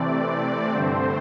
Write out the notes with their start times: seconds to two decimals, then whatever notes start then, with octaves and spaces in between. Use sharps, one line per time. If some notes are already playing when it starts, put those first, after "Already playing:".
Already playing: C3 E3 A3 C4 D5
0.73 G2 D3 A3 C4 C5